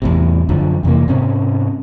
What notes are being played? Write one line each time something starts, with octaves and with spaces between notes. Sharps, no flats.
E2 A2 C3
F#2 D3 F3
F2 C3 E3 A#3
G#2 C3 C4 C#4